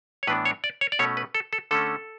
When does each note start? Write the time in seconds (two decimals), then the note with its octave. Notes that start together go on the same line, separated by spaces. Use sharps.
0.23 C#5
0.27 A2 E3 B3 D4 B4
0.45 C#5
0.64 D5
0.81 C#5
0.92 D5
0.99 B2 A3 C#4 C#5
1.17 B4
1.35 A4
1.53 A4
1.71 D3 A3 C#4 A4